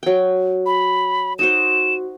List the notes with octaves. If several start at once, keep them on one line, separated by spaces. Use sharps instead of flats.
F#3 G5
B5
D#4 F#4 C5 E7